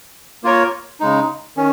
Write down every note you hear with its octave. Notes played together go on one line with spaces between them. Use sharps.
A#3 F4 A#4 C#5
C#3 G#3 D#4
D#3 C#4